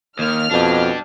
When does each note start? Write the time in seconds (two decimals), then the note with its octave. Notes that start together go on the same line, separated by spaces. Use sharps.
0.19 D#2 A#3 F6
0.51 F2 B2 D4 G4